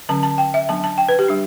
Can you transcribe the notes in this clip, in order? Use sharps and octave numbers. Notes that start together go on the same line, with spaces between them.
D3 F#3 C#4 A5
A5
G5
E5
F#3 B3 D4 A5
A5
G5
B4
G4
G3 D4